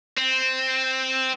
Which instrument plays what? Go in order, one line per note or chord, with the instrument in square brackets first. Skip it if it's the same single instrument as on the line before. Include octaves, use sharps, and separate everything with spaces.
[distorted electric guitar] C4